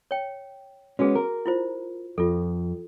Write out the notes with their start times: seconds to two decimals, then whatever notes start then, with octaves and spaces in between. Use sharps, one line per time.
0.11 C#5 G5
0.99 G#3 B3 C#4 F#4 G#4
1.15 A#4
1.46 E4 F4 C5
2.18 F2 F4 A4